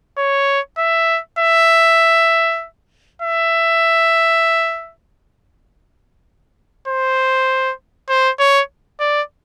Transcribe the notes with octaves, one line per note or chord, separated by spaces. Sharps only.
C#5
E5
E5
E5
C5
C5
C#5
D5